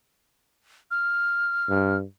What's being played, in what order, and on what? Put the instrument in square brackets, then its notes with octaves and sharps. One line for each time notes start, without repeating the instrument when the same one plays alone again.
[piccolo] F6
[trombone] G2